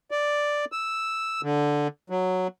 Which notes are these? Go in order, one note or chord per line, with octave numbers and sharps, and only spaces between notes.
D5
E6
D3
F#3